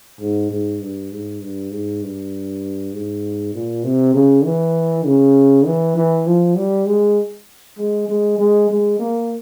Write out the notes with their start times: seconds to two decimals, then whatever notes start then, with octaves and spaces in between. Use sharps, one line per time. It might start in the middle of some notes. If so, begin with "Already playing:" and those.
0.20 G#2
0.51 G#2
0.81 G2
1.12 G#2
1.42 G2
1.72 G#2
2.03 G2
2.93 G#2
3.54 A#2
3.84 C3
4.14 C#3
4.45 E3
5.06 C#3
5.66 E3
5.97 E3
6.27 F3
6.57 G3
6.87 G#3
7.78 G#3
8.08 G#3
8.38 G#3
8.69 G#3
8.99 A#3